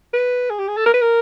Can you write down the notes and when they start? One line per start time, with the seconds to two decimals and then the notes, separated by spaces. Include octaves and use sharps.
0.14 B4
0.50 G#4
0.59 G4
0.68 G#4
0.77 A4
0.86 A#4
0.94 B4
1.02 A#4